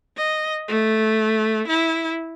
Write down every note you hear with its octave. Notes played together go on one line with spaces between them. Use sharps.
D#5
A3
E4